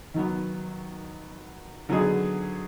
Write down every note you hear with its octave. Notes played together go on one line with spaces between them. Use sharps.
D#3 F#3 B3
D3 F#3 B3 D#4 G#4